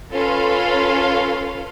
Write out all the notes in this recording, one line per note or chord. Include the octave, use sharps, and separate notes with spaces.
C#4 F4 A4 B4 F5 C6